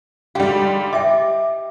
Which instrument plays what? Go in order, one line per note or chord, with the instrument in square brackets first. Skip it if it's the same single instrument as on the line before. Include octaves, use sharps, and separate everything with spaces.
[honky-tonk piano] G#2 D3 G3 [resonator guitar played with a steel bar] G4 [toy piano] F5
[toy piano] D#5 E5 G5 [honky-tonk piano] D6